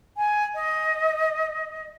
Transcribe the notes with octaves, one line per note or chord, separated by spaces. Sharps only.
G#5
D#5